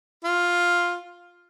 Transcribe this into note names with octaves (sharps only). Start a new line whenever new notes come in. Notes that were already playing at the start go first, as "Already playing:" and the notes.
F4